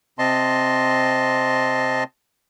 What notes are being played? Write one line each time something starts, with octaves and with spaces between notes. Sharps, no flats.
C3 C4 D#5 A5 C6